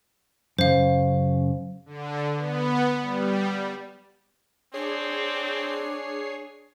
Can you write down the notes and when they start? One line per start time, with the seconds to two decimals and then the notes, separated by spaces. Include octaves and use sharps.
0.59 F#2 C#3 C5 F5
1.86 D3
2.36 B3
3.01 G3
4.74 C4 D4 G#4 C#5 C7